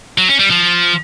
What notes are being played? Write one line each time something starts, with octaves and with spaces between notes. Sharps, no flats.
F#3
C#4
G3
F3